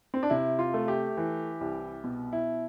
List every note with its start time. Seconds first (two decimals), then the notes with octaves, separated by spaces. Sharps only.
0.14 C4
0.23 D4
0.30 C3 E4
0.59 F4
0.74 A3
0.88 G4
1.17 E3
1.61 C2
2.04 B2
2.33 E4